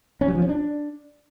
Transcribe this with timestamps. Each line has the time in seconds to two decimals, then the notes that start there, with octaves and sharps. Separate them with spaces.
0.21 C#4
0.28 F#3
0.35 F3
0.42 C#4
0.49 D4